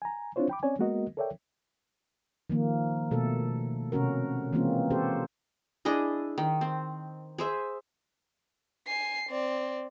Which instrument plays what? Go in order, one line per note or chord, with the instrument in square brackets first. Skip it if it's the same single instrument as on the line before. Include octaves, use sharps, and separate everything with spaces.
[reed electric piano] G#5 A#5
C4 D4 E4 F4 C5 C#5
G5 B5 D6
C4 C#4 C#5 D5 G#5
G#3 A#3 B3 F#4 A#4 D#5
A4 A#4 C#5 D5 E5 G5
[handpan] D#3 F3 A#3
B2 A3 A4
C3 C#4 F#4 A#4
E3 G#3 A#3 C4 C#4 F4
F#4 G4 A4 C5
[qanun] D4 E4 G#4 D#5
D#3
C4
G#4 C5 E5
[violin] G#5 C7
C4 D5